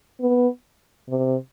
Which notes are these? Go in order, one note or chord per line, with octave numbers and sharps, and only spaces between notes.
B3
C3